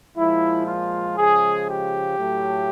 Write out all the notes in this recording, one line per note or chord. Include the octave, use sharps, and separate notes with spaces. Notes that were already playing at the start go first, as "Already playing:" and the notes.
A#2 F3 G#3 E4
F4
C#3 F3 G#3 G#4
G4
A2 F#3 A3